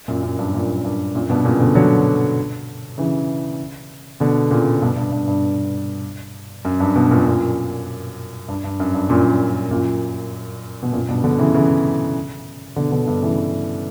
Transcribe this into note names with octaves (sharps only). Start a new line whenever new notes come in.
F#2 A#2
F#2
G2
F#2 A#2
G2
F#2 A#2
G2 B2
A#2 C#3
B2 D3
D3 F#3
C#3 E3
B2 D3
A#2 C#3
G2 B2
G2
G2
G2
F#2
G2
G2 B2
F#2 A#2
F#2 A#2
G2
G2
F#2
G2
F#2 A#2
F#2 A#2
B2
F#2 A#2
G2 B2
B2 D3
C#3 E3
C#3 E3
B2 D3
B2 D3
G2 B2
C#3 E3